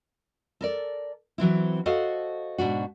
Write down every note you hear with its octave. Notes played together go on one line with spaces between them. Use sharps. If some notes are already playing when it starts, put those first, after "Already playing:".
A4 A#4 D5
E3 F#3 C4 E4
F#4 A4 C5 D#5 F5 F#5
G#2 B2 D4 F#4